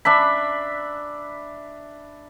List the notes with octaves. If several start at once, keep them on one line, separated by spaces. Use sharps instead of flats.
D4 E5 B5